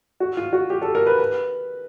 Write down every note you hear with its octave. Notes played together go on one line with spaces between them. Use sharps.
F#4
F4
F#4
G4
A4
A#4
B4
B4